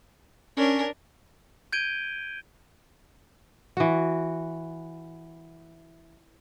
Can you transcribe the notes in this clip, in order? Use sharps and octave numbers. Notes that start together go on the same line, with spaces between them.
C#4 D4 A#4
G6 G#6 D7 D#7 G7
E3 F#4